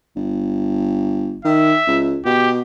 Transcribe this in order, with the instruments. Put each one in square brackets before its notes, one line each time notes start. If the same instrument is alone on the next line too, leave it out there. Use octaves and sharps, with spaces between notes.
[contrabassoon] G1
[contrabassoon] D#3 [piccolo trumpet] E5
[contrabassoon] C#2
[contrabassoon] B2 [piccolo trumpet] G4